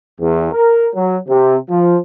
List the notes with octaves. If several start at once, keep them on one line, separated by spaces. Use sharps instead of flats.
E2
A#4
F#3
C3
F3